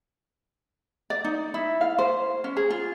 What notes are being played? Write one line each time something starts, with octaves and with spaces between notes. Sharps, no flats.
D5
D#4
E4
F5
C5
C#4
G#4
F4